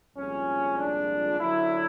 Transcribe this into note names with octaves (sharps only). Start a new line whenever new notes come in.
C2 A#2 F3 G#3 C#4
D4
F#2 D3 F#3 E4